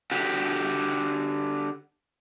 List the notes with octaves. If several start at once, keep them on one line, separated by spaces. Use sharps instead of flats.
D3 F#4 G4